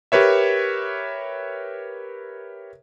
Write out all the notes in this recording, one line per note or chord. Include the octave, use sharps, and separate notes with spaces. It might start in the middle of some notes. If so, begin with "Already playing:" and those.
G4 A#4 B4 C#5 E5